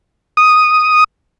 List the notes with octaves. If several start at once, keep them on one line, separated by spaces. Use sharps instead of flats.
D#6